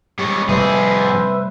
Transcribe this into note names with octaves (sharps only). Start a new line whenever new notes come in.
G3 G#3 C#5
F2 C3 G3 A3 G#4 B4 C5 E5